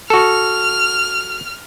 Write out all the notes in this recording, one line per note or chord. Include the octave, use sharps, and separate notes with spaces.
F#4 A4 F6